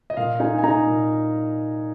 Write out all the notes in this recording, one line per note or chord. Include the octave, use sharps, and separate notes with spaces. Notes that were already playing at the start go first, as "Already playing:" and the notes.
D#5
A#2 F5
D#4 G#5
G#5
D#4 A#5
A#2